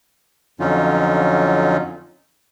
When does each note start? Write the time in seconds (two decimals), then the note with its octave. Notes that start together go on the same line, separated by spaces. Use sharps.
0.60 F2 D3 F#3 C#4 D#4 F4